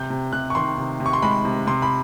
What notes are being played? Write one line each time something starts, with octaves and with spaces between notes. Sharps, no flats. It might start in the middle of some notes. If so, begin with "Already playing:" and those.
Already playing: C3 G6
C3
C3 F#6
C#6
D#3 C6
C3
C3
C#6
C6
G#3 B5
C3
C3 C6
B5